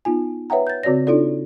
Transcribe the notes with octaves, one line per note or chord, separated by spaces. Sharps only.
B3 D#4 F4 G#5
B4 C#5 E5 F#5 G5 A#5
G6 A6
C#3 C4 F#4 C#5 D5 A#6
D4 D#4 F4 A4 D5